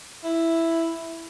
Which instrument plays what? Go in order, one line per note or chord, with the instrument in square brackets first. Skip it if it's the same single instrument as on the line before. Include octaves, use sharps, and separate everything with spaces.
[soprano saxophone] E4